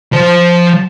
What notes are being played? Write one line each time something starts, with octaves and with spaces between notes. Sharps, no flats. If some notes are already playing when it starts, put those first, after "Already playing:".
F3 C5